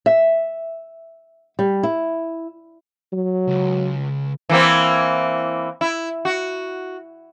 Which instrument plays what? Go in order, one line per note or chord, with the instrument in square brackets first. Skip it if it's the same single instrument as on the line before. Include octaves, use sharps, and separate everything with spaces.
[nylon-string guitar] E5
G3
E4
[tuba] F#3
[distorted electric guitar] C#2
[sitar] E3 A#3 C4
E4
F#4